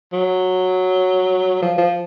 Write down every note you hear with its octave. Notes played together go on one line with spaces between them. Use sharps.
F#3
F3
F3